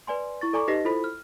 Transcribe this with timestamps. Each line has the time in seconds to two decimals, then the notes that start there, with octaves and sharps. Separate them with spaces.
0.07 B4 D5 G#5 C6
0.41 E4 C#6 A6
0.53 A4 D5 G#5 A#5 C#6 D6
0.68 D#4 G4 B4 D#5 A#6 B6
0.85 E4 F4 A4 C5 B5 B6
1.04 F6